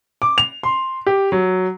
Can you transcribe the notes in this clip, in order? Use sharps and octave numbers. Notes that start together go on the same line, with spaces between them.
D6
F7
C6
G4
F#3